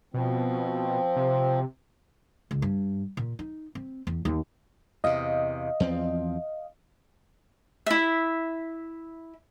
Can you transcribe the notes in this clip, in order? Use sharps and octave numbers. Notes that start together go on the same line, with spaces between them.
B2 F3 C4
C3
C#2
G2
A#2
D#4
C4
E2
D#2
E2 C3 D#5 F5
E2 F3 C4
E4 E5